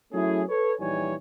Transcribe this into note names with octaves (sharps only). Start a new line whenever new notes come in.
F#3 A3 C#4 E4 G#4
A4 B4 C#5
A#1 E3 G3 D#4 C#5 G#5